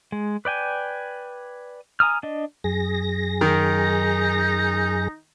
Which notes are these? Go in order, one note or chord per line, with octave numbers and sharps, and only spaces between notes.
G#3
B4 D5 G5 G#5
G#5 A#5 D#6 F6
D4 D#5
F#2 G#4 A#6
D#3 D#4